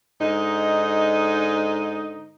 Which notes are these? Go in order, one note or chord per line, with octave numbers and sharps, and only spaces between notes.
G#2 D3 D#4